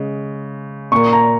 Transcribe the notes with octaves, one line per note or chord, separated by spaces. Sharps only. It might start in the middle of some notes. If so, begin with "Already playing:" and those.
Already playing: C#3 G#3
A#2 A#3 C#6
A#5